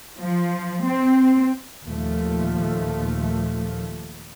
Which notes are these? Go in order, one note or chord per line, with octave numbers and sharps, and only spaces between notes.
F3
C4
D#2 A#2 F3 A3